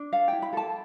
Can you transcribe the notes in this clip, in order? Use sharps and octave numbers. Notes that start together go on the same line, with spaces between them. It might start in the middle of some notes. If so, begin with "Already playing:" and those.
Already playing: D4
A4 F5
E4 G5
B5
A4 A5